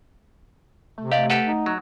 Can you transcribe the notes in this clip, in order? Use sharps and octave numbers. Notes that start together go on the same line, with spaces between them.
C3 A3
G4 D5 D#5 F5
G4 A4 B4 F#5
D#4
F#3